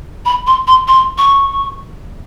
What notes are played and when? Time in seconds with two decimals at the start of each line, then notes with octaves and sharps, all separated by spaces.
0.25 B5
0.47 C6
0.67 C6
0.88 C6
1.18 C#6